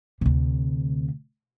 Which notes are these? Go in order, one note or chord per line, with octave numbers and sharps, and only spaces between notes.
D2 C3